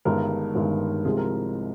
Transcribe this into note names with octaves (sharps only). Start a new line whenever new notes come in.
G1 G2 D#3 G#3 A#4
G1 G2 D#3 G#3
C2 C3 F3 G#3 G#4
A#4